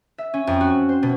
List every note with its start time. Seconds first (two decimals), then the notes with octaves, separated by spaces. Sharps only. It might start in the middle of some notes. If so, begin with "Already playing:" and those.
0.18 E5
0.34 C#4
0.47 F2
0.61 F#4
0.89 C5
1.03 B2